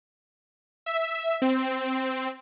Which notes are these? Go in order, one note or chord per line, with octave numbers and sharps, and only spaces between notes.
E5
C4